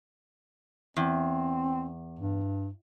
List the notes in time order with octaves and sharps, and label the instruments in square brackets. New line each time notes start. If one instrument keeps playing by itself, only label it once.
[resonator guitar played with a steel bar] E2 [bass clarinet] C4
[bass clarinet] G2